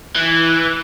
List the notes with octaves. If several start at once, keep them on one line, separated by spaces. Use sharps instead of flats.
E3